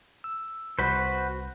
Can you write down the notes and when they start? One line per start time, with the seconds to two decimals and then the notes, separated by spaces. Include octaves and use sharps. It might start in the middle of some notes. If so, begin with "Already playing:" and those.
0.24 E6
0.79 C2 F#4 B4 C5 B5